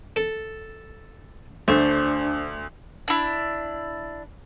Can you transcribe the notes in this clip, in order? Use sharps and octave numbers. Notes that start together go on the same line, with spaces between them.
A4
D2 A3 D4 C5
D4 E4